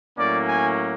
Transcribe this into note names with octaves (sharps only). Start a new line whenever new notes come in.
A2 F#3 A#3 C#4 D5
G#5